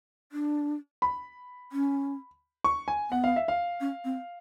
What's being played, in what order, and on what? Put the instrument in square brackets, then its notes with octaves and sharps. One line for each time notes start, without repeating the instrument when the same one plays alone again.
[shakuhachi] D4
[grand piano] B5
[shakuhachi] C#4
[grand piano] C#6
G#5
[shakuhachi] B3 [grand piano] F#5
[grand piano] F5
E5
F5
[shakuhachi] C#4
C4